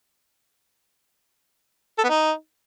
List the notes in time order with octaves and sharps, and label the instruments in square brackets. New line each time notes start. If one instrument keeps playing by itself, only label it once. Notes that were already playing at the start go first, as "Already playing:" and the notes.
[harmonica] A4
B3
D#4